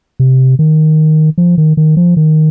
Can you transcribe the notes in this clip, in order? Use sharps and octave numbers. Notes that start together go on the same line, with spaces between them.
C3
D#3
F3
D#3
D#3
F3
D#3